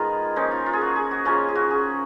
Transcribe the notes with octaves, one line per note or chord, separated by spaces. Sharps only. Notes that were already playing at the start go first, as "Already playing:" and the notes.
Already playing: D#3 G#3 B3 F4 G#4 A#4
F3 A#3 C#4 D#4
F4
F4
G#4
F#4
G#4
F#4
C#3 F3 A#3 C#4 F4
G#4
F#4
G#4